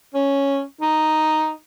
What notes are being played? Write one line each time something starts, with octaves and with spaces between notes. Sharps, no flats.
C#4
D#4